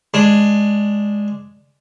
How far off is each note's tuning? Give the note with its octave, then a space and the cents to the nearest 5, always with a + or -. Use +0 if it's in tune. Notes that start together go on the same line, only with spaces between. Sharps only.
G#3 +0 D4 +0